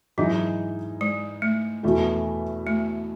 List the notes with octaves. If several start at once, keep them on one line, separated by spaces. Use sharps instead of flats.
G#2 E3 F#3 G#3 D#4 G#4
G#3
A3
E2 B2 A3 E4
A3